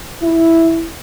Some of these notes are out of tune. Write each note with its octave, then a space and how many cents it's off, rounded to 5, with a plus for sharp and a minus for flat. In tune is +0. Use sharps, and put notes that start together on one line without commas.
E4 +0